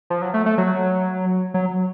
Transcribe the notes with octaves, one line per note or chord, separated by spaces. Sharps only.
F3
F#3
A3
A3
F#3
F#3